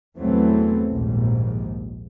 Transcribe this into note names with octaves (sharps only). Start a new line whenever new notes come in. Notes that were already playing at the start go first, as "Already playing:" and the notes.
E2 E3 F#3 A3 C4
A#1 D#2 G#2